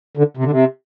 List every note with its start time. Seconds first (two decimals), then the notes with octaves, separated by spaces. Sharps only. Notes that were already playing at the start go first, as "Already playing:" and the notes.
0.17 D3
0.37 C3
0.44 D3
0.51 C3